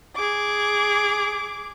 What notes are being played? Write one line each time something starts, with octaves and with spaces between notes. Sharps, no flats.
G#4 D6